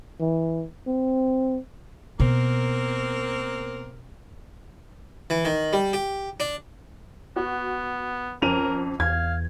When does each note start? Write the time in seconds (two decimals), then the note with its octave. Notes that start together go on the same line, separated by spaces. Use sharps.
0.20 E3
0.87 C4
2.20 B2 A#3 C4 A#4
5.30 E3
5.45 D#3
5.73 G3
5.93 G4
6.40 D4
7.36 B3 F#4
8.42 F2 C#4 A#4 D#7 F7
9.00 E2 F5 G#6